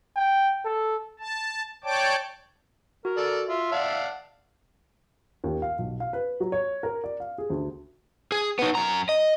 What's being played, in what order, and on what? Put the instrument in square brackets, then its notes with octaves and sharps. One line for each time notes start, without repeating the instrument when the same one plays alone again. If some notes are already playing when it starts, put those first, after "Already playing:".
[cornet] G5
A4
[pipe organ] A5
C#5 D5 G5 A5 D6
[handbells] F#4 [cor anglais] A#4
[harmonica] A4 D5
[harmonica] F4 [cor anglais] E5
[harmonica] D5 F5 F#5 [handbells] A5
[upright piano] D#2
F5
B1
F5
B4
F#3
C#5
A#4
D5
F5
G#4
D2
[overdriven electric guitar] G#4
B3 D#4
F#2 A#5
D#5